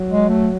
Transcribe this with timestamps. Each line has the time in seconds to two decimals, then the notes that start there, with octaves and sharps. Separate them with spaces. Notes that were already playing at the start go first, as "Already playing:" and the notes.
Already playing: F#3
0.11 G#3
0.29 A3